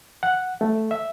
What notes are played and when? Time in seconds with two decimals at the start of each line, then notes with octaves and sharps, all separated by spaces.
0.23 F#5
0.61 A3
0.91 E5